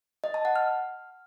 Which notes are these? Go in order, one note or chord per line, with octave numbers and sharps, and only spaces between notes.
D#5
A5
F#5
F6